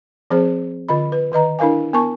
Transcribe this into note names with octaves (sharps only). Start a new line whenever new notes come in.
F3 C4 G#4 C5
D3 F4 D#5 B5
B4
D#3 B4 D#5 A#5
D4 E4 A#4 F5 G#5
B3 A#4 A5 C#6